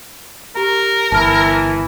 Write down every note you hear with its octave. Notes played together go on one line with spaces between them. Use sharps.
G4 A#4 A#5
G1 E3 E4 A5 F6